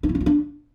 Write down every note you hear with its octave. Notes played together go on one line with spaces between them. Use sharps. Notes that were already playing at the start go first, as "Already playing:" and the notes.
D4
E4
C#4
F4
D4